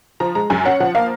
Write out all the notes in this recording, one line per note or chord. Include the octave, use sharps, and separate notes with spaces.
F3 A#5
G#3 A#5
F#2 G#5
C#4 F#5
F3 F#5
A#3 F5